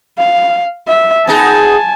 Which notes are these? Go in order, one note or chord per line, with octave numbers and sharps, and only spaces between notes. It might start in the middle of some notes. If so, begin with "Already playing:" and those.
F5
E5
B3 D#4 G#4 G#5 A5